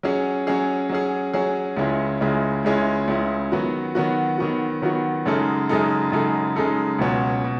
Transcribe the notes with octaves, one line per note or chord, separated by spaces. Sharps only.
F#3 C#4 G#4
F#3 C#4 G#4
F#3 C#4 G#4
F#3 C#4 G#4
C#2 C#3 G#3 C#4 E4
C#2 C#3 G#3 C#4 E4
C#2 C#3 G#3 C#4 E4
C#2 C#3 G#3 C#4 E4
D#3 F#3 B3 F#4
D#3 F#3 B3 F#4
D#3 F#3 B3 F#4
D#3 F#3 B3 F#4
F#2 C#3 G#3 D#4 A4
F#2 C#3 G#3 D#4 A4
F#2 C#3 G#3 D#4 A4
F#2 C#3 G#3 D#4 A4
C#2 B2 F#3 C#4
B2